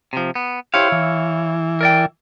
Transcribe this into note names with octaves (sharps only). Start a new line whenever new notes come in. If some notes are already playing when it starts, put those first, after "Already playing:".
C3 F3
B3
E4 G4 C5 C#5 F5
E3
A#4 D5 G5